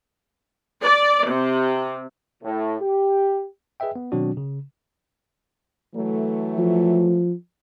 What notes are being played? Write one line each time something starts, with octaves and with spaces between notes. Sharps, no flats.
D5
C3
A2
G4
G#4 B4 D#5 E5 G5
B3
B2 D#3 F#3 C4 D4 F#4
C#3
E3 F#3 A3
F3